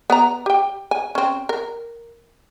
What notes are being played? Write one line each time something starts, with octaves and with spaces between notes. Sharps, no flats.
B3 D5 A#5
G4 G5
G#5
C4 C#4
A#4